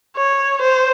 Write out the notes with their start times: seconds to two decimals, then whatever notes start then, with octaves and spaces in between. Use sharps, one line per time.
0.17 C#5
0.61 C5